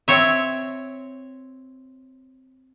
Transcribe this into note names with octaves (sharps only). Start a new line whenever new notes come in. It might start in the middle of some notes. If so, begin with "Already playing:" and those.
C4 C#5 E5